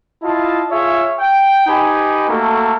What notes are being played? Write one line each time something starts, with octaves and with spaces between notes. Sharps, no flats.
E4 F4 D#5 A5
F4 G#4 C#5 E5
G5
D#4 G4 B4 G#5
A3 A#3 F#4 A4